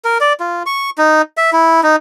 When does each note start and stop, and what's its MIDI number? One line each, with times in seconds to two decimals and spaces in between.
0.05 0.18 70
0.21 0.33 74
0.40 0.63 65
0.66 0.90 85
0.98 1.22 63
1.37 1.50 76
1.53 1.81 64
1.83 1.96 63